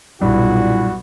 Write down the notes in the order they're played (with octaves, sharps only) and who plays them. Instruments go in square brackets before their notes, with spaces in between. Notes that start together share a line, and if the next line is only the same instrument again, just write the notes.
[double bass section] B1 [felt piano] G2 [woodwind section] A#2 E4 [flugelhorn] F#4